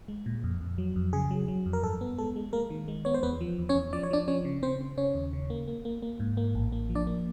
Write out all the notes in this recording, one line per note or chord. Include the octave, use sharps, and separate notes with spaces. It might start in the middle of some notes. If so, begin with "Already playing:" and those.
G#3
A#2
F2
F2
F#3
F2
C#3 G#4
F#3
F#3
F2
A#4
G2 A4
B3
G#3 A4
G#3
G#3 A#3 A#4
D#3
G#3
B3 C#5
C5
E2 B3 B4
F3
E2
C#4 C#5
E2
F3 D5
C#5
F3 D4 D5
F3 C#4 C#5
C#3
C#3 C4 C5
C#3
C#3 C#4 C#5
D#2
C#3
A#3
A#3
A#3
A#3
G#2
A#3
A1
A#3
F3
D4 D5
A#3